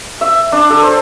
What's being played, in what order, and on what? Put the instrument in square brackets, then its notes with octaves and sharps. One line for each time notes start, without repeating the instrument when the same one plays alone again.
[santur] E5
D4
A4
C5